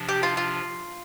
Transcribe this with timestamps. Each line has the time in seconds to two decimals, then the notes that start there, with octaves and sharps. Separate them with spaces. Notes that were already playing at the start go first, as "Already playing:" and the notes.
Already playing: C3 F3 D4
0.09 G4
0.23 F4
0.37 F4